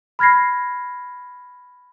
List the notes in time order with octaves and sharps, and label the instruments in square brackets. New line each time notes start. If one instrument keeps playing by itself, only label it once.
[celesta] B5 F6 G#6 A#6 C7